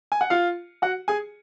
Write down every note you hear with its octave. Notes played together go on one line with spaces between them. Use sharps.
G#5
F#5
F4 F5
F#4 F#5
G#4 G#5